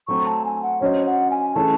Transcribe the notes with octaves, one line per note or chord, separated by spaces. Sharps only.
F#3 A3 C4 C#6
A5
G#5
F#5
F#3 C#4 F#4 C5 C#5 D#5
F#5
G#5
E3 A3 C#4 G#4 A5